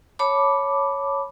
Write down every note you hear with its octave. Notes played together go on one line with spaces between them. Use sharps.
C#5 A5 B5 D6